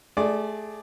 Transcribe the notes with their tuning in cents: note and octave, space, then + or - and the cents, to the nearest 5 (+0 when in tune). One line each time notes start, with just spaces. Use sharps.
A3 -25 G#4 -10 D5 +0